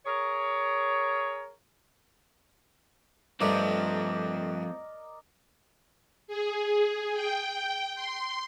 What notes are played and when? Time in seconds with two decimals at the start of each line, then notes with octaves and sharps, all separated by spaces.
0.06 G#4 A#4 C#5
3.41 G2 F3 A3 C4 A#4 D5 D#5
6.28 G#4
7.13 G5
7.95 C6